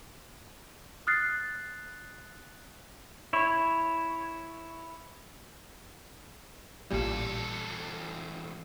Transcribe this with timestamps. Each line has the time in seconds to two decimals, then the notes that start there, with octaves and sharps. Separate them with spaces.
1.07 D#6 F6 F#6 A6 C7
3.33 E4 C#5
6.90 A1 E2 A#2 G3 A4